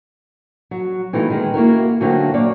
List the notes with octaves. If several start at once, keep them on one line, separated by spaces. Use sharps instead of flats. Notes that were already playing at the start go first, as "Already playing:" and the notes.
F#3
A#2 E3 A3 B3 D#4 F4
D#3 G#3
A#3 E4 F#4 A#4
A#2 D3 F#3 A3 A#3 C4
A#3 C#5 D5